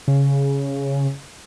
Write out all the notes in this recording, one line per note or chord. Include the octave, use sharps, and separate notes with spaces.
C#3